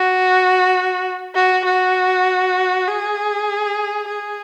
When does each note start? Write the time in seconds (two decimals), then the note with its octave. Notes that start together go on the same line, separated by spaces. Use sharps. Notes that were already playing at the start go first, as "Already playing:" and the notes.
Already playing: F#4
1.34 F#4
1.65 F#4
2.87 G#4
4.08 G#4